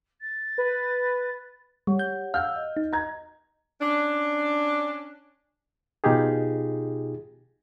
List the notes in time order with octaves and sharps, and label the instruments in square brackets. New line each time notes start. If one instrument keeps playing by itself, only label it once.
[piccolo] A6
[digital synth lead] B4
[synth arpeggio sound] G3 [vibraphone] G4 C#5 F#5
[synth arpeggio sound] G6
[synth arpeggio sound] F5 F#5 [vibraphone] E6 [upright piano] F6 G6
[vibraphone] D#5
[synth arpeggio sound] D#4
[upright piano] A#5 G#6
[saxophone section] C#4 D4
[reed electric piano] B2 D#4 F4 G4 G#4